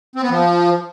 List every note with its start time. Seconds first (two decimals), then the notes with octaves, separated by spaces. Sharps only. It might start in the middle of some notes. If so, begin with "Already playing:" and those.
0.16 C4
0.23 B3
0.30 F3